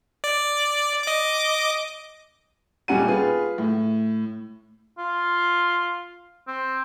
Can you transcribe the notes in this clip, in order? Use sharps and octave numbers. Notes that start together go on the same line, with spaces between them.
D5
D#5 D6
D#1 G3 C#4 F#5 G#5 D#7
F4 G#4 B4
A2
F4
C4